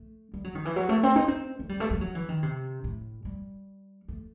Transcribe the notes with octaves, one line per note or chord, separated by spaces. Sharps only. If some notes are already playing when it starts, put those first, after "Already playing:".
Already playing: A3
G3
F#3
D#3
E3
F#3
A3
C4
D#4
C4
A3
G3
A3
G3
F#3
E3
D#3
C3
A2
G3
A3